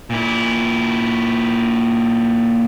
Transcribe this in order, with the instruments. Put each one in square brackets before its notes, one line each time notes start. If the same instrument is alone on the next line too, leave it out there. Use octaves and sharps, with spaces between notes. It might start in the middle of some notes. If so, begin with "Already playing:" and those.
[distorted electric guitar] A#2 E4